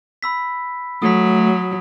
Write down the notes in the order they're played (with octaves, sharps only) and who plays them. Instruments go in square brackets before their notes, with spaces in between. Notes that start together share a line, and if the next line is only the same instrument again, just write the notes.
[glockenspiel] B5 E6 B6
[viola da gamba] F#3 [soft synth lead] A3 [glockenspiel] D#6 B6